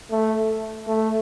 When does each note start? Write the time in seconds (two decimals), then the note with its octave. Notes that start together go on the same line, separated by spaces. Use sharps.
0.10 A3
0.87 A3